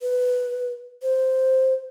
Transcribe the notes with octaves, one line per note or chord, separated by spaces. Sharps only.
B4
C5